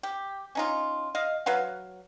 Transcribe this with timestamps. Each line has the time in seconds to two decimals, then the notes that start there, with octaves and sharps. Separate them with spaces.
0.03 G4
0.55 C#4 D#4 F4
1.15 D#5 F5
1.46 F#3 B4 F5 F#5